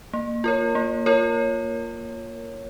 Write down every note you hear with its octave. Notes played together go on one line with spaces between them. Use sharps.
A#3
F4 A#4 C#5
A#3
F4 A#4 C#5